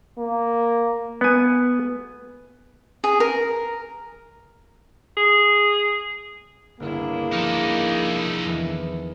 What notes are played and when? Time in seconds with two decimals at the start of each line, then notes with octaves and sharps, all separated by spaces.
0.18 A#3
1.21 B3 G#5
3.04 G#4
3.20 A#4
5.17 G#4
6.80 G1 C#2 A#3 D4 E4 G#4
7.33 F3 D#4 A4 F6
8.45 E2 D#3 E3